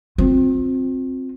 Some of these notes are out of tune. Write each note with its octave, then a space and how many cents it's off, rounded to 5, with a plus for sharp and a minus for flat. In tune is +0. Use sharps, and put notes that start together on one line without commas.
C4 +0 F4 +40